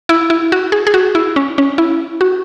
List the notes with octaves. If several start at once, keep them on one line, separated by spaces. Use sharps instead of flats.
E4
E4
F#4
G#4
G#4
F#4
E4
C#4
C#4
E4
F#4